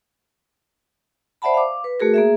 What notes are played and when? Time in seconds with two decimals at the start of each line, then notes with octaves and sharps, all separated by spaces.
1.42 C5 D5 E5 F#5 A5 B5
1.54 F5 D6
1.84 B4
2.00 A3 F#4 G#4 A#4
2.14 A#3 G#4 E5